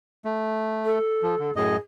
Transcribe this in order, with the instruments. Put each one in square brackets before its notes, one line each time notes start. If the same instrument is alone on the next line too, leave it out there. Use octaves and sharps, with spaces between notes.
[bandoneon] A3
[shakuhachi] A4
[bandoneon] F3
D3
[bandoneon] F#2 A2 D#5 [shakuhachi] G#4